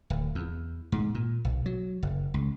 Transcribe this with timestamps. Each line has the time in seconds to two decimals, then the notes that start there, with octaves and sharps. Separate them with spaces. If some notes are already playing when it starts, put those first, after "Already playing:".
0.10 D1
0.35 E2
0.92 G#2
1.15 A#2
1.45 B1
1.66 F#3
2.03 F#1
2.34 C#2